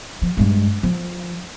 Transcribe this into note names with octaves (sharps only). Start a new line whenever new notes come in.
F3
G2 G#3
F3